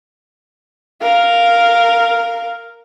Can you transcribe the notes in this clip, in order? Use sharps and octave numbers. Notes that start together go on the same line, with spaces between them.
A#4 F5